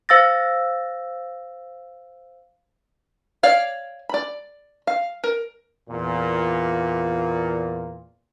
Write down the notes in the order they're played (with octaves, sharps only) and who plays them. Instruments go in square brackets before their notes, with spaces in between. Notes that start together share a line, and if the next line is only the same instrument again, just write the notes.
[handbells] C5 F5 E6 A6 A#6
[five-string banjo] C#5 D5 F5
D5 B5
F5
A#4
[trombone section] E2 A#2